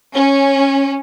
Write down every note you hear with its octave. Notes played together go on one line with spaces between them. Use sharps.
C#4